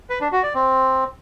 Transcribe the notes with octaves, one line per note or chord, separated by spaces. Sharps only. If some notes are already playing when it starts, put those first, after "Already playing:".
B4
D4
F#4
D5
C4